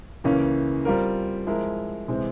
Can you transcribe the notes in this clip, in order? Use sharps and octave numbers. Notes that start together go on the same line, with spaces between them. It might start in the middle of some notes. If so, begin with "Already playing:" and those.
C#2 C#3 E3 A#3 C#4
G3 C4 F4 A#4
F3 G#3 E4 A#4
C3 E3 G#3 C4